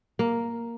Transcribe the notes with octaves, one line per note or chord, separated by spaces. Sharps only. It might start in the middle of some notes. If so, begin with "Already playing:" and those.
A#3